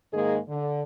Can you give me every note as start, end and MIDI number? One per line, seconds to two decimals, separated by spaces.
0.13 0.39 44
0.13 0.39 51
0.13 0.39 56
0.13 0.39 58
0.13 0.39 68
0.13 0.39 75
0.49 0.82 50